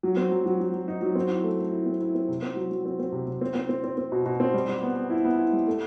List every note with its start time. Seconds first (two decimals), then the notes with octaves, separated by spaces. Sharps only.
0.03 F#3
0.17 C4
0.31 F#3
0.46 F#3
0.60 F#3
0.74 F#3
0.88 D#4
1.02 F#3
1.15 C4
1.30 E4
1.44 A3
1.59 A3
1.72 E4
1.86 C4
2.01 E4
2.15 C4
2.28 C3
2.42 C4
2.56 F#3
2.71 F#3
2.85 C4
2.99 C4
3.12 C3
3.27 C3
3.41 C4
3.55 C4
3.69 C4
3.84 C4
3.98 C4
4.12 B2
4.25 B2
4.40 C4
4.54 G3
4.68 G3
4.82 B3
4.96 B3
5.10 E4
5.24 B3
5.38 E4
5.53 G3
5.67 A3